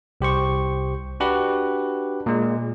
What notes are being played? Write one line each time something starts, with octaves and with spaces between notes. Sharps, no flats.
C2 G4 C5 C#6
D4 F#4 G4 B4
A#2 G#3